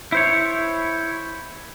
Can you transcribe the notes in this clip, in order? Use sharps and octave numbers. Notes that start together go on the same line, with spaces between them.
E4 C5 C#5